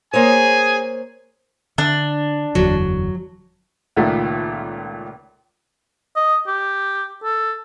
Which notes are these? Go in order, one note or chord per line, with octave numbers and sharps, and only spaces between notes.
A#3 G#4 C5 C#5 G#5
D3 D4
F#1 E2 D3 F#3
C#2 A#2 D#3 A3
D#5
G4
A4